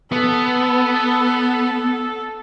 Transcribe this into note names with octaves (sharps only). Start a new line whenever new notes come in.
B3 A4